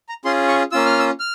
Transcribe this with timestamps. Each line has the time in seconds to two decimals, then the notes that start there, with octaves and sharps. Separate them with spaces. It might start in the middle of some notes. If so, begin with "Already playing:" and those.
0.09 A#5
0.25 C#4 F4 G#4 C6
0.48 C#6
0.72 A#3 C#4 F4 E6
0.86 F6
0.99 E6
1.20 F6